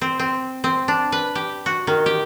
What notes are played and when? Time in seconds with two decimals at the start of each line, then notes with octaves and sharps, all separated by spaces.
0.01 C4
0.19 C4
0.64 C4
0.88 D4
1.12 B4
1.35 G4
1.66 F#4
1.87 D#3
2.06 G4